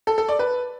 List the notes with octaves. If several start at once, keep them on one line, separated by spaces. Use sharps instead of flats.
A4
A4
D5
B4